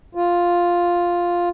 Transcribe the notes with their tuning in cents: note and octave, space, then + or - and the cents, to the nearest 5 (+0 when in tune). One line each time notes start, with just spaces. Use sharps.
F4 +0